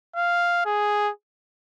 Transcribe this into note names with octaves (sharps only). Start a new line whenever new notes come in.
F5
G#4